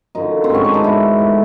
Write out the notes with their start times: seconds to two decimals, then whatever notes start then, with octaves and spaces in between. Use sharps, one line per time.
0.15 F#2 D3 F3 D#4
0.44 C4
0.50 G#2 D#3 F#3 B3 C#4
0.64 D4
0.74 D#4
0.84 G#2 D#3 F#3 B3 E4
1.19 G#2 E3 A3